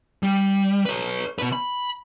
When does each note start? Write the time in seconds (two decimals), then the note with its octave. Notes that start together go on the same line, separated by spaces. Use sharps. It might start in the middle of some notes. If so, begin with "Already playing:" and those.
0.23 G3
0.85 B4 C#5
1.39 B2 B4
1.52 B5